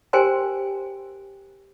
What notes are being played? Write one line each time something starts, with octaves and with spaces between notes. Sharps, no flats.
G4 A#4 C5 G5 G#5 C6